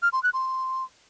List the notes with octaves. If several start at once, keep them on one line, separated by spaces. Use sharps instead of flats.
F6
C6
F#6
C6